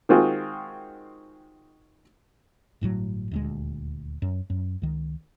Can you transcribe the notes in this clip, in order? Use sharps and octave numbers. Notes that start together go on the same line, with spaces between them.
D#3 G#3 C4 F4 F#4 G#4
G1 A2 C3 F#3
D#1 D2 G#3
F#2
F#2
C#2 D#3